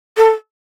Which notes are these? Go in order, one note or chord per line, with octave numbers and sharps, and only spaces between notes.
A4